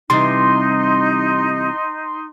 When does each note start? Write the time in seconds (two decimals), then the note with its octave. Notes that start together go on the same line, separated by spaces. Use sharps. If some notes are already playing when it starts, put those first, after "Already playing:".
0.10 C3 E3 G3 D#4 C6